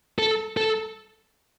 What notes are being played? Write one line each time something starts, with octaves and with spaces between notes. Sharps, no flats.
A4
A4